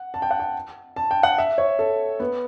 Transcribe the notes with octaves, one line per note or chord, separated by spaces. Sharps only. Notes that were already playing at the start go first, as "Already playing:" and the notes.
Already playing: F#5
A5
G5
F#5
G5
A5
G5
F#5
E5
C#5
A4
B3